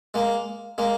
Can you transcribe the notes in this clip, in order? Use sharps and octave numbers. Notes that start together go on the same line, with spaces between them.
G#3 A#3
G#3 A#3